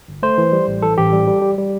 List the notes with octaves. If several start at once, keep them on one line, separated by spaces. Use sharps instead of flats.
G1
A3 C5
E3
G3
A1
E3 A4
A1 G4
G3
G3
G3
G3